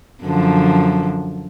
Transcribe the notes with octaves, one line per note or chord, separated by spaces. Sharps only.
F#2 D3 F3